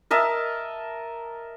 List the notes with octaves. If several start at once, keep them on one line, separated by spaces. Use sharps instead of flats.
A#4 D#5 E5 A5